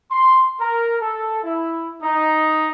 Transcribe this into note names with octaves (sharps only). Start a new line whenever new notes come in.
C6
A#4
A4
E4
D#4